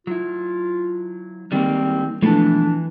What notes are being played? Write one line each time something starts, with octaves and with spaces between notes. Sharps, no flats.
F#3 E4 F4
D#3 G3 G#3 A#3 C4
B2 E3 F3 G#3 A3 D4 A4